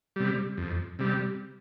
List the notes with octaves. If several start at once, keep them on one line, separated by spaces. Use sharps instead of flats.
C3 G3
F2
C3 G3